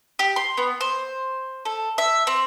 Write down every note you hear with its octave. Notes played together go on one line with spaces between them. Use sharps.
G4
C6
B3
C5
A4
E5
C4